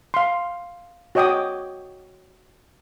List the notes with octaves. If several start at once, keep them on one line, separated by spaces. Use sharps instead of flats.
F5 C6
F#4 C#5 D#5 G5 D6 D#6